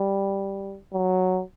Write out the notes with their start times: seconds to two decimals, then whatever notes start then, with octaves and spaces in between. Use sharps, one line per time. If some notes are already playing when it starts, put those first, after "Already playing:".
Already playing: G3
0.93 F#3